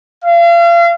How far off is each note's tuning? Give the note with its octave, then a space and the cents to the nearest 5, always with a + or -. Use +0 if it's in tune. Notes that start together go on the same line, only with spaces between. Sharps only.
F5 -35